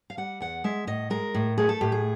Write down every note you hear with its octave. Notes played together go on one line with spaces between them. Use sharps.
F5
G3 F#5
E2 F#5
G#3 E5
A2 D#5
G#3 A#4
A2
A3 G#4
A4
A2 G4
G#4